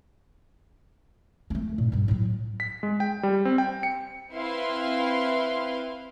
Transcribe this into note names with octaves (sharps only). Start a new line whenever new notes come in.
A3 A#3
A#2
G2 G3
A2 F#3
B6
G#3
G5
G3
C4
G5
C#7
C4 E4 B4 F5 C6